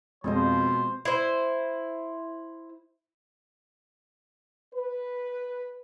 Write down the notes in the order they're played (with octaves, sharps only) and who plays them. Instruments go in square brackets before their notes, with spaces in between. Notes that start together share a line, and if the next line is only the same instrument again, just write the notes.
[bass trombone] F2 [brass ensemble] B2 F3 [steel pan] G#3 C4 D#5 [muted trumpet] C5
[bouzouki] E4 C5
[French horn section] B4